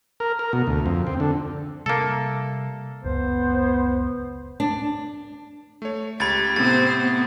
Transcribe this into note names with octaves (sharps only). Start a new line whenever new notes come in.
A#4
A#4
B2
D2
F2
C4
D3
C3 G3 A#3 A4
F#1 C#2 B3 C5
D4
A3 C#5
C#2 G4 B5 G#6 A6
A2 C3 B3 C4 C5 A6
B3